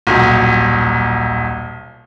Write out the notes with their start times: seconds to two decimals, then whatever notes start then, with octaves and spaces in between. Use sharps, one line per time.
0.07 D#1 B1